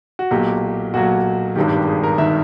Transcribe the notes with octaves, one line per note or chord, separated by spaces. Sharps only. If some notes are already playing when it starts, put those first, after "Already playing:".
F#4
B1 A#2 F#3 G4
B1 A#2 F#3 F#4
G#1 G2 D#3 G4
G4
G#4
A#4
D#3 E5